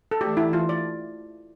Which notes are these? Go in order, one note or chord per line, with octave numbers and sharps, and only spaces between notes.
A4
E3 A3 D4 G4
E4
F4
D5